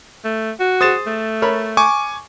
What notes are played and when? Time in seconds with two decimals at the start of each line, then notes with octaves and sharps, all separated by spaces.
0.24 A3
0.60 F#4
0.81 G#4 C5 D#6 A6 E7
1.06 A3
1.42 A#4 C#5 B5
1.77 G#5 C#6 D6